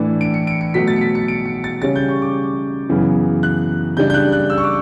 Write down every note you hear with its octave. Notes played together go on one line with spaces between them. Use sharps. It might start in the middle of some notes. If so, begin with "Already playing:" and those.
Already playing: A2 E3 A3 D4
D7
C#7
D7
C#7
B2 F#3 A3 B6
A6
C#7
B6
C#7
D7
C#7
A6
C#3 G3 C#4 A6
G6
C#6
D6
F#2 C#3 E3 B3
F#6
C#3 G3 D4 G6
G6
F#6
F#6
E6
C#6
D6